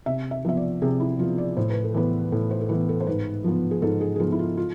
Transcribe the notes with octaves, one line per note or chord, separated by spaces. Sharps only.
C3 E5
E5
F3 B3 E5
D5
C3 G#4
E4
F3 B3 F4
D5
A2 C5
B4
A4
E3 B3 B4
A2 A4
C5
A4
E3 B3 B4
A4
C5
G#2 B4
F3 B3
G#4
G#2 A4
G#4
G#4
F3 B3 F4
E4
F4
F4